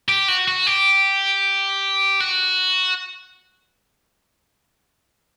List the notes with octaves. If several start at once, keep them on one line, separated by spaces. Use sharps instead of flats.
G4
F#4
F#4
G4
F#4